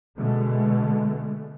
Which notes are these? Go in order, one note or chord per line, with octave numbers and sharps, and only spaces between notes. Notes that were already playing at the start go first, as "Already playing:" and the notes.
B2 D3 G#3 A3